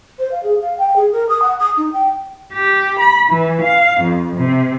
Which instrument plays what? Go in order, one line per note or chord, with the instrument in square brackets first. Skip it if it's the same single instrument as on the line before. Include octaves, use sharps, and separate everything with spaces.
[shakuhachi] C5
F5
G#4
F5
G5
G#4
A#4
D#6
F#5
D#6
D#4
G5
[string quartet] G4
B5
E3
F5
F2
C3